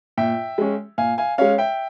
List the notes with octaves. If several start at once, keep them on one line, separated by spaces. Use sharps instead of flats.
A#2 E5 G5
G#3 C#4
A#2 F5 G#5
F5 G#5
G#3 C#4 C#5 F5
E5 G5